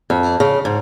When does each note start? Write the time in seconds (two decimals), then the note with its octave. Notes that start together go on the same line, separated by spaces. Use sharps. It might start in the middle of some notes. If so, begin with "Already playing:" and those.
0.10 F2
0.40 C#3
0.65 G#2